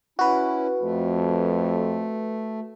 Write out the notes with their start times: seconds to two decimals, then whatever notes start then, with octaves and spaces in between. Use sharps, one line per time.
0.19 C#4 E4 F#4 B4
0.82 F2 A3